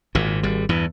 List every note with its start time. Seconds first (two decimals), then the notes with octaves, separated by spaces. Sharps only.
0.15 G#1 A#2
0.43 G#1 G3
0.69 E2 G2 E3